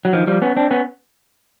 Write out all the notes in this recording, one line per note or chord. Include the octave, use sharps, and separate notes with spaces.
F#3
D#3 F3
F3 G3
B3 C#4
C4 D4
B3 C#4